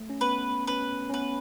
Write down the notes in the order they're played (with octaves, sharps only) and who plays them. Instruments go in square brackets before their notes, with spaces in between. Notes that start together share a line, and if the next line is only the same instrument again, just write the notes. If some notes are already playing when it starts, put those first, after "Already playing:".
Already playing: [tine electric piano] A3
C#4
[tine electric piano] B3 [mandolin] B4
[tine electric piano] C#4 [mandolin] B4
[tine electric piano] C#4
[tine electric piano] B3 [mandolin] B4